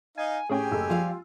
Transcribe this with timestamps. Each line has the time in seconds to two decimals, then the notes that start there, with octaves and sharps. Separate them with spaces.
0.18 D#4 D#5 F5 G#5
0.50 A2 C#4 G4 G#4 G5 G#5
0.72 F#1 A3 E6
0.90 F3 G3 F4 F5